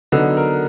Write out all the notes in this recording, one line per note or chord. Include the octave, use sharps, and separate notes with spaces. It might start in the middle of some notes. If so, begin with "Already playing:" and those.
D3 F#3 B3 D#4
A#4